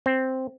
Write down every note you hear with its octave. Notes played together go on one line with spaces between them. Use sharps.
C4